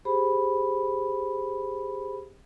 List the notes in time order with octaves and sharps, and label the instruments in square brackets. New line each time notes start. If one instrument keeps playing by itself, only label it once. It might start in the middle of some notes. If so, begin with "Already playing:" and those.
[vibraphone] G4 G#4 C5 B5